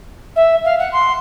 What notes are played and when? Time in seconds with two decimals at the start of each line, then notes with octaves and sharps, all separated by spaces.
0.36 E5
0.65 F5
0.79 F#5
0.92 C6